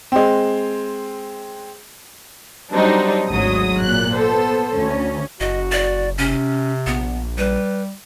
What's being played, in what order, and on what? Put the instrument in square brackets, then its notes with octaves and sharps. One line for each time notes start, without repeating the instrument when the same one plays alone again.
[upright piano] G#3 C4
[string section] F#3 G3 C4 D4 D#4
G#1 D2 F#3 G#3 D#6
A#2 F#6
B3 A4 C5
D2 C#4
[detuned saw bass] F#1 [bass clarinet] F#4 [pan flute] D#5
[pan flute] D5
[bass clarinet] C3 [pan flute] C#4
[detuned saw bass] A#1 [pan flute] B3
[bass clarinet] G3 [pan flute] B4